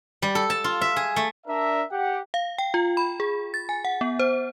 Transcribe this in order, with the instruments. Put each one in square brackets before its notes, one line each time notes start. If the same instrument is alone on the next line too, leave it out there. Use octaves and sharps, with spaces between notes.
[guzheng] G3
A4
A5
F4
E5
G#4
A3
[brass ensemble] D4 A#4 E5
G4 F#5
[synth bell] F5
G5
F4
B5
G#4
A6
G#5
F#5
B3
C5